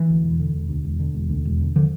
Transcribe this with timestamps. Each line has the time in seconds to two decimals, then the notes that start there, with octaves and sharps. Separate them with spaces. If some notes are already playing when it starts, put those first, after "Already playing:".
Already playing: E3
0.09 D2
0.24 E1
0.39 D3
0.54 E1
0.69 D2
0.85 E1
1.00 D3
1.15 E1
1.29 D2
1.45 E1
1.60 D3
1.76 D3 F3